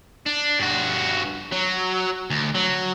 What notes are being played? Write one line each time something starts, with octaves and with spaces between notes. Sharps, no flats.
D4
G2 F#4
F#3
D2
F#3